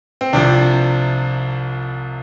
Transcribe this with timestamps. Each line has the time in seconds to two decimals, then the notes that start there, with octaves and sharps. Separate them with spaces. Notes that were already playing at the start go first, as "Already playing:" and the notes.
0.21 C4
0.33 C2 C3 F3 D4